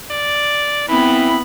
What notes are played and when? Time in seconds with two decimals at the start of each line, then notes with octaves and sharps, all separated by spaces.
0.11 D5
0.89 E3 B3 C4 E4 B5